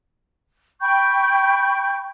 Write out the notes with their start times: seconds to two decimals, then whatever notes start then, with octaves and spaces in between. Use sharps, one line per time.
0.81 G5 B5 C#6 G6